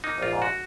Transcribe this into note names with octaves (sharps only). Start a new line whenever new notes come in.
A#3 D#4
A#1 F4
G#2
F#4